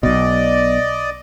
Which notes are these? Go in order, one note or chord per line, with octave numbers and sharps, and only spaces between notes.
B1 B2 D5 D#5